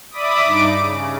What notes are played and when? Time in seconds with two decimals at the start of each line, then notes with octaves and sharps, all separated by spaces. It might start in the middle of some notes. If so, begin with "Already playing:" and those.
0.10 D5 E5 B5 D6 D#6
0.43 G2 D#4 D6 D7
0.79 C#3